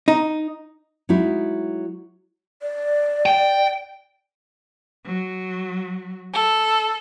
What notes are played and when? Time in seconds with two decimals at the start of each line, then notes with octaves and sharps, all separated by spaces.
0.08 D#4
1.09 F#3 G#3 D#4 E4
2.62 D5
3.26 G5
5.04 F#3
6.34 A4